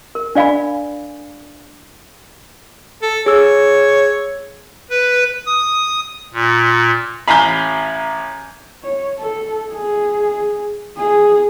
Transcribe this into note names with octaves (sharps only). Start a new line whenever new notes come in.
A#4
D4 D5 F5 G#5 B5
A4
G#4 C#5 E6
B4
D#6
A#2
A1 F5 G#5 A#5 B5 G6
C#5
A4
G#4
G#4